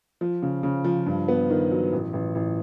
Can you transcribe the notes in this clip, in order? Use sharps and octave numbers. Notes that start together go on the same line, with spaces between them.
F3
C#3
C#3
F3
G2
B3
D#3
F#3
A1
A1
A1